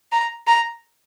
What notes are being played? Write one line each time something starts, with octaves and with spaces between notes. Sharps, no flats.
A#5
A#5